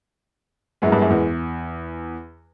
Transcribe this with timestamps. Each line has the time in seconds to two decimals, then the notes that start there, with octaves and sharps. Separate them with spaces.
0.82 F#2 G#3 B3 E4 G#4 B4
0.92 G2
1.02 F#2
1.10 E2